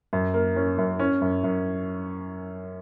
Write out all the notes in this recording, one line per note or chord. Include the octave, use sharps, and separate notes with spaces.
F#2
A#3
C#4
F#2
C#4
F#2
F#2